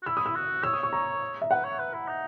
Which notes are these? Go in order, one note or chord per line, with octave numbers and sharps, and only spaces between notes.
F#4
E4 E6
D#6
E6
F#4
C#5 E6
D#6
C#6
A#5
E5
B4 F#5
C#5
B4
E4
D#4